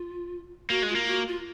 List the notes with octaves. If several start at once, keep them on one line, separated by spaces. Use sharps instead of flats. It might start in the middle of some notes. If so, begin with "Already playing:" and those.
Already playing: F4
A#3 F#4
G#3
F4
A#3
F#4
F4